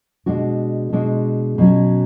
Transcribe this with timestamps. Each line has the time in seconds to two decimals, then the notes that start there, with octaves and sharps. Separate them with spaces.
0.26 B2 G#3 D4 F#4
0.92 B2 G#3 D4 F#4
1.58 B2 F#3 C#4 F#4